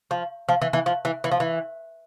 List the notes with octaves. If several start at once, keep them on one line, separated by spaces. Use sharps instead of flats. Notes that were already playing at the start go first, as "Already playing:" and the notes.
F3
F3
E3
E3
F3
E3
E3
F3
E3